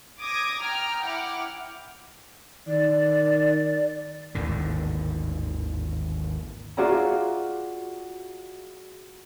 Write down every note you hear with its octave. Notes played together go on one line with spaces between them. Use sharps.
D6 D#6 G#6 A#6 D7
G5 A#5 F6 D7
E4 F#5 G5 D6 F6
D#3 D5
G#1 D#2 A2 D3
F4 F#4 G#4 D5 E5 A#5